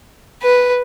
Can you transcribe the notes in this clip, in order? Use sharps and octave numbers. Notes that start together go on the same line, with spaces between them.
B4